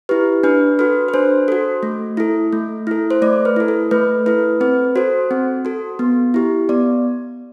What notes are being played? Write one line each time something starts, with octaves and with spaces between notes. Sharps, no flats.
E4 G4 B4
D4 B4
F#4 A4 B4
B4
D4 C5
F#4 A4
A3
E4 A4
A3
E4 A4
C5
A3 D5
B4
E4 A4
A4
A3 B4
E4 A4 B4
C4 B4
F#4 A4 C5
C4
F#4 A4
B3
E4 G4
B3 D5